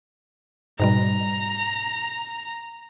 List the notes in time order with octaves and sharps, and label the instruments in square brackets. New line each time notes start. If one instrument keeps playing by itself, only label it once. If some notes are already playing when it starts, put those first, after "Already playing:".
[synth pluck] G#2 B2 G3 [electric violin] A#5